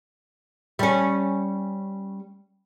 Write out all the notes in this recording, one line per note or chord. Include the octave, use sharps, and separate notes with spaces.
G3 C#4